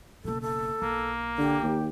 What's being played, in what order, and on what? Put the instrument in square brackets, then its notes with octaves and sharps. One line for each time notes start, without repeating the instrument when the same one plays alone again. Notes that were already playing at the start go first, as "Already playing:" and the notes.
[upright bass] F#1 B2 [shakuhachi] A4
[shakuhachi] A4
[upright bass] B1 [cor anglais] A#3
[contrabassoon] D3 [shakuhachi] G4
[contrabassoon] D#2